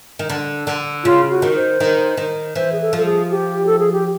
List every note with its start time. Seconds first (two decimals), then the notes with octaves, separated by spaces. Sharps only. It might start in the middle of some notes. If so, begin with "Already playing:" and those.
0.19 D#3
0.30 D3
0.67 D3
1.04 C#3 F4
1.30 F#4
1.42 D#3
1.56 C5
1.80 D#3
2.17 D#3
2.56 E3 C5
2.72 G#4
2.81 A4
2.93 F3 A4
3.05 G#4
3.31 G4
3.66 A4
3.79 G#4
3.92 G4